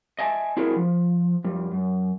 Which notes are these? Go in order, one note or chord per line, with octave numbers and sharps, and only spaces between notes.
D#5 E5 G#5 A5
C4 D4 E4 F#4 G#4 A#4
F3
F2 G3
F#2